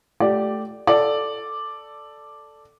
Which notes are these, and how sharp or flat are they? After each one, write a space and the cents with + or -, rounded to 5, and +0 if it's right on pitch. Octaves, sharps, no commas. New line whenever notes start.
A3 -15 G4 -15 D5 +0
A4 +0 D5 +0